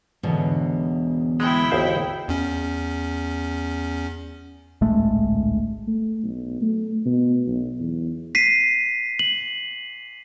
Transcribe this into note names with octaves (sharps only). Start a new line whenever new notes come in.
E2 G#2 B2 D3 E3 C#4
G#3 B3 E4 G5
G#1 D#2 C5 D#6 G6 B6
E2 C#4
D1 A#1 G#3 A3
A3
B1
A3
B2
B1
E2
B6 C7 D#7
F#7